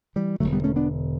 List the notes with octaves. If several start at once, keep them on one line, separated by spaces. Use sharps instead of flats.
E3 G3
E1 E2 D3 F#3 A3
G3 B3
A3 C#4
B3 D4